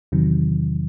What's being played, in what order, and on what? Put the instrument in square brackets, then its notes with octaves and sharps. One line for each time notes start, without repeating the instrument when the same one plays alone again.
[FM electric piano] E2 C3 D#3 F#3